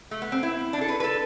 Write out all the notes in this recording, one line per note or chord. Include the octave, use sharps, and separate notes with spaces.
A3
B3
C4
E4
D4
A4
B4
B4
A4